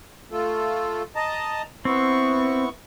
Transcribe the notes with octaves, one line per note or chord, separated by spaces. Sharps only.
A3 F4 A4
D#5 A5 A#5
B3 C4 E4 C#6